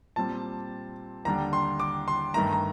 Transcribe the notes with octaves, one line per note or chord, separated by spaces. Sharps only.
A#2 G3 C4 A5
D#2 D3 G3 D4 A#5
C6
D6
C6
G2 D#3 A3 A#5
A#5